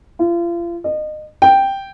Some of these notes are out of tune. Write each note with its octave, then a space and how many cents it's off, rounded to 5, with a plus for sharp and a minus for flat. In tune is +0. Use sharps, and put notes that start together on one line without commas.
F4 -35
D#5 -30
G5 +0